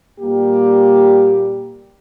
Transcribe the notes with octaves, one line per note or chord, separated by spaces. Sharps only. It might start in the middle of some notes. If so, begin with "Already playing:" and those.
A#2 G3 A#3 G4